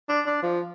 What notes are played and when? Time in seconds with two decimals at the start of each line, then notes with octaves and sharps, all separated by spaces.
0.09 D4
0.27 D4
0.42 F3